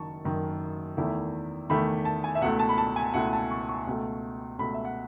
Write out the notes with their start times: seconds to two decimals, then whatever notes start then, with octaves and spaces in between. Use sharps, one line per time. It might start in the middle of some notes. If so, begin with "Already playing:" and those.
Already playing: F#1 F#2 D#3 A5 C#6
0.24 F#1 F#2 D#3
0.97 E2 D#3 A3 E4
1.69 E2 D#3 A3 E4 B5
2.05 A5
2.24 G#5
2.35 E5
2.41 C#2 B2 A3 E4 F#5
2.59 A5
2.69 B5
2.78 A5
2.96 G#5
3.14 C#2 B2 A3 E4 F#5
3.33 A5
3.50 C#6
3.69 C#6
3.87 C#2 B2 A3
4.59 C#2 B2 A3 B5
4.74 E5
4.85 F#5